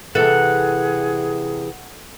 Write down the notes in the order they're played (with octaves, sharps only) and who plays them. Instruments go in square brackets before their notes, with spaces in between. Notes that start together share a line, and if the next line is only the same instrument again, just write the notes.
[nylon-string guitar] C3 E3 [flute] G#4 [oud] A4 [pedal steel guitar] F#5